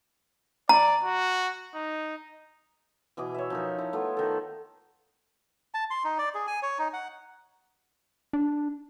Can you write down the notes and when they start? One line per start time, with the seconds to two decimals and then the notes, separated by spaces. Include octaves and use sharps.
0.69 D5 A#5
1.04 F#4
1.74 D#4
3.17 B2 E3 D#5 D6
3.34 C#5 E5
3.50 F3 D#4 A#4
3.78 E4
3.93 A3 B3 F4
4.17 D#3 A4
5.74 A5
5.91 C6
6.04 D#4
6.18 D5
6.35 G#4
6.47 G#5
6.63 C#5
6.79 D#4
6.93 F#5
8.33 D4